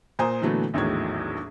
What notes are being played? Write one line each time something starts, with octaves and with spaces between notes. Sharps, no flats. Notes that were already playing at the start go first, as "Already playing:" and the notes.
A#2 C5 G#5 A#5 D#6
A#2 D3 E3 F#3 A3 B3
A#1 E2 A2 D#3 F#3 G#6